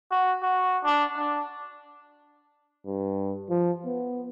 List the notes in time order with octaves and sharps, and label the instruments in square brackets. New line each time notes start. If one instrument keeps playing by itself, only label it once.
[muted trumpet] F#4
F#4
D4
D4
[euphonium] G2
F3
B3